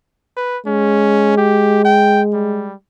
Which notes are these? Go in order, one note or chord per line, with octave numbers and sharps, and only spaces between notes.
B4
G#3 C#4
G4
G5
G3